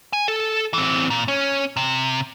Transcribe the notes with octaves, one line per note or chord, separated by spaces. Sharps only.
G#5
A4
E3 C4
A#2
C#4
C3